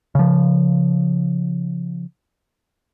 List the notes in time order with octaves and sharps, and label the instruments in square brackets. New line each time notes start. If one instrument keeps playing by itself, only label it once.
[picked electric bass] C#3 F3